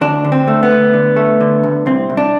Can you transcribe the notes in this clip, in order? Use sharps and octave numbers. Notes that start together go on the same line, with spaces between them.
D2 D4
D3
C4
A3
B3
D2
D3
A3
D3
D2
C2 C4
C2
D4